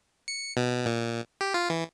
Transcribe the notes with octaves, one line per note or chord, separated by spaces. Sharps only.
C#7
B2
A#2
G4
F4
E3